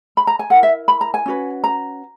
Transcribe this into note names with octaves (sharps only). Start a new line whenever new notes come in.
B5
A#5
G#5
E4 A#4 F#5
E5
B5
A#5
G#5
C#4 F#4 B4
A#5